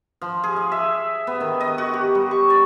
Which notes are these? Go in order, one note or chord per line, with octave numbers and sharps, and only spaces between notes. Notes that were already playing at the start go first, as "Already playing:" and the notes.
F3
G#4
F5
E5
B3
D#3
D#5
F#4
G4
G3
C#6
D5